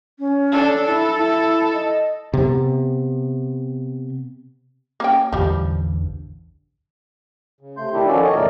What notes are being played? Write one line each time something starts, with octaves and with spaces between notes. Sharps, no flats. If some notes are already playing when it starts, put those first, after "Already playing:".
C#4
D4 A4
E4 A4
E4
D#5
C3 B3
A#3 C#4 G5
A1 E2 D3 F3 G3
C#3
C3 A3 C6 G6
D#3 A3 D4 E4 G4
D#3 F3 C#4 F#4 A4 D5
D#3 C#5 D#5
E2 A#2 C#3 A3 A#4 D5